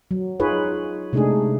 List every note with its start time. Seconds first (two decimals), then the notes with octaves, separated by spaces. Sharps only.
0.11 F#3
0.40 D#4 F4 G#4 B4 C#5
1.13 C3 G#3 A3 D4 D#4 G#4